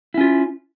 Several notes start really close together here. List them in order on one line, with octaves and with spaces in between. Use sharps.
E4 C#4 F4